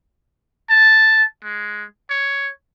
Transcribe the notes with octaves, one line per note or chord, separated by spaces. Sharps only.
A5
G#3
C#5